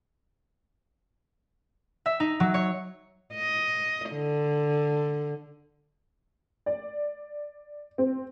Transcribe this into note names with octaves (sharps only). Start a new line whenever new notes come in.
E5
D#4
F#3
C#5
D#5
D3
D5
C4